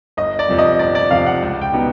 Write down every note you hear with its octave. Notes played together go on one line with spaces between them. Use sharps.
G1 D#5
D5
F2 C3 F3
D#5
G1 D5
D5
F2 C3 F3 F5
F#5
C#2
G5
B2 G3 B3 D#4